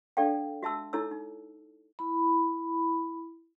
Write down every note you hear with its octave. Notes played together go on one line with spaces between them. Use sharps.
D4 A4 D5 F5 G5
F#4 E5 A5 E6
D#4 E4 A4 C#5 E6
D#4
E4 B5